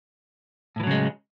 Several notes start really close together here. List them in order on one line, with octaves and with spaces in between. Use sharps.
A2 E3 F#3 C#3 G#3